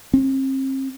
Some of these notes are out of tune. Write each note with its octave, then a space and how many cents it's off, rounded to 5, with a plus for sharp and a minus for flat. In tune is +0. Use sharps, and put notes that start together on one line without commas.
C4 +40